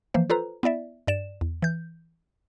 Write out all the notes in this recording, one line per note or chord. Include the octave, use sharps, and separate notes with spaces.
E3 F3 A#3 C5
F4 A4 B4 C5 A#5
B3 E4 D5 E5
G2 D5 E7
E2
E3 G6